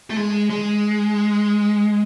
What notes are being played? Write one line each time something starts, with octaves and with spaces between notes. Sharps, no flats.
A3
G#3
G#3